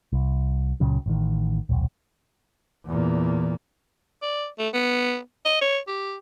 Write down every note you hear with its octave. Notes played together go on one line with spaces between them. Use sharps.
C2
C#2 A#2 C#3 F#3
A1 D#3
D#1 B1
E2 A#2
D5
A3
B3
D#5
C#5
G4